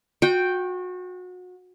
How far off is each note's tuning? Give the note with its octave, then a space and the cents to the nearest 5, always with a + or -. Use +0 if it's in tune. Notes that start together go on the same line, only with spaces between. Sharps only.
F#4 -30 G5 +0